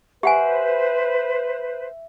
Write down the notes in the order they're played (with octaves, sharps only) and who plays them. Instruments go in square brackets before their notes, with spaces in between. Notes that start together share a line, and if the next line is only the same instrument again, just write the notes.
[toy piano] G4 F#5 G#5 [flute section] B4 C5 [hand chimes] E5